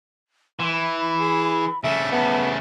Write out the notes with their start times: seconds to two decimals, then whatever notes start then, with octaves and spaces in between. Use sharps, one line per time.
0.59 E3 C6
0.72 B5
1.19 G#4
1.84 C#3 A3 E5
2.12 B3 A5